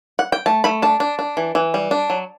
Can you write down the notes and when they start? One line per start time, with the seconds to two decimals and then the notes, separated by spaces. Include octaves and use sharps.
0.19 F#5
0.32 G5
0.46 A3 A5
0.64 A3 B5
0.82 D4 A5
1.00 D4
1.19 D4
1.37 E3
1.55 E3
1.74 G3
1.91 D4
2.10 F#3